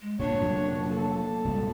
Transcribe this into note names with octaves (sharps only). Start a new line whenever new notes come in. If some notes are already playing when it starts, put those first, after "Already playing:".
G#3
A#2 D3 D4 C#5
F1 A#2 F#3
A#3 A4
C#2 G2 B2